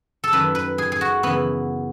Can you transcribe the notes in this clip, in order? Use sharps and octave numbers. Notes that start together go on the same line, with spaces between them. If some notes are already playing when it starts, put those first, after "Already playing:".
A4
F#2 D#3 B4
B4
G#4
G#4
F#4
F#2 C#3 E3 B3